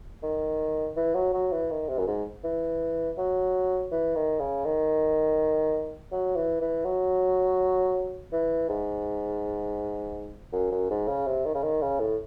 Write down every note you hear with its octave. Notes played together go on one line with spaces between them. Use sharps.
D#3
E3
F#3
F#3
E3
D#3
C3
F#2
G#2
E3
F#3
E3
D#3
C#3
D#3
F#3
E3
E3
F#3
E3
G#2
F#2
F#2
G#2
C#3
C3
D#3
C#3
D#3
C#3
A2